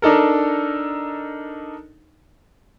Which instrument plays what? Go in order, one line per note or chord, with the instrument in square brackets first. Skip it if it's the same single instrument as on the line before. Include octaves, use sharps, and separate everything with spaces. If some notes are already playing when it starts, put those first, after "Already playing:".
[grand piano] D4 D#4 A4 A#4